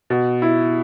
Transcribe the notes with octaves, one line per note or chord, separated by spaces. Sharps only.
B2
E4